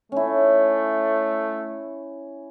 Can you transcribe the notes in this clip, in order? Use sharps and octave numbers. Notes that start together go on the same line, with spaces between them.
A3 C#4 E4